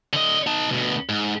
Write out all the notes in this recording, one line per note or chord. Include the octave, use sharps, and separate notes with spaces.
D3 D#5
D#4 A5
D2 B2
G#2